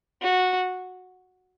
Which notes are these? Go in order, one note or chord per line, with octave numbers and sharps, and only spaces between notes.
F#4